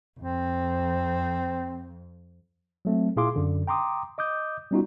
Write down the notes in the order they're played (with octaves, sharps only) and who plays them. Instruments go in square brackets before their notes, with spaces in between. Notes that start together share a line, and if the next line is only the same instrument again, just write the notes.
[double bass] F2 [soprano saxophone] C4
[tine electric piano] F#3 A3 C4
A#2 E4 G#4 F5 C6 D6
F#2 D3
G5 A#5 C6 D6 D#6
D#5 D6 D#6 G6
G3 B3 C#4 D#4 F4 F#4